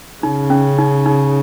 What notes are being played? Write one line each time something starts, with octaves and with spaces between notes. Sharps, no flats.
C#3 D#4
C#4
D#4
D#4